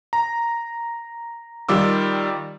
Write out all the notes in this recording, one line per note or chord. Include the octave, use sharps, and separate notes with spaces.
A#5
D#3 G3 F4 D6 E6